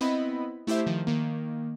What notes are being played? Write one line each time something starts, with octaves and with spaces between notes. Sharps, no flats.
B3 C4 E4 D#5 B5
A3 E4 G4 C5 E5
D#3 F3
D#3 A#3